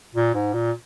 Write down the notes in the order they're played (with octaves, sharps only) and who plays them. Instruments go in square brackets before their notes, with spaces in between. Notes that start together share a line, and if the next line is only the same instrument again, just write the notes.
[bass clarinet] A#2
G#2
A#2